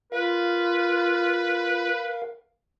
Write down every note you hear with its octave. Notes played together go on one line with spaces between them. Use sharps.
F4 A#4 B4 F5